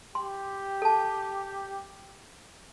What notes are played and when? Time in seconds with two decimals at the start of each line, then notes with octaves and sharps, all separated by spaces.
0.15 G4 C6
0.82 A4 A5